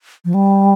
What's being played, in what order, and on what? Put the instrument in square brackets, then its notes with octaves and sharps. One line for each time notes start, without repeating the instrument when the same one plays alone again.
[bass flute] F3
G3